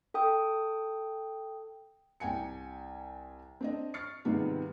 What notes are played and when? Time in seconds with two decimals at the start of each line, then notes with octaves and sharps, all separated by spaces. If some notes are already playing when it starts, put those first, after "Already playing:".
0.14 A4 G5 D#6
2.20 C2 G5 G#5 C#7
3.61 C4 D4 D#5
3.94 C#6 F6 A6 C7 C#7
4.25 G#2 C3 D#3 G3 B3 F4